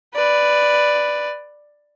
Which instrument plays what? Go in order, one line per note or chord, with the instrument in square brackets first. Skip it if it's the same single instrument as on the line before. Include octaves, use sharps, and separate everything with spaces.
[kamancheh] B4 D5